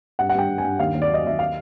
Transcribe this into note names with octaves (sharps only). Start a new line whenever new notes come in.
G2 F#5
F#5
G2 G5
G2
G#5
G2
D#2 F5
D#2
D5
F#3 D#5
D#2 E5
F5